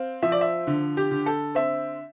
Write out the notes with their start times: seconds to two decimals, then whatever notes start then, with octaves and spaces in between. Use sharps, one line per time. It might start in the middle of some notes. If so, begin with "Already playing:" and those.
Already playing: C4 F5
0.22 F3 E5
0.32 D5
0.41 E5
0.67 D3
0.97 G4
1.11 D3
1.26 A4
1.55 C4 E5